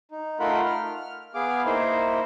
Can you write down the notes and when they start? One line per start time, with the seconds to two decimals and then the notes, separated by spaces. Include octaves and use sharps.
0.11 D#4
0.40 A3 D#4 F4 A#4 F#5 B5
0.66 F6
1.35 B3 G#4 F5 D6
1.65 A#3 D#4 E4 C5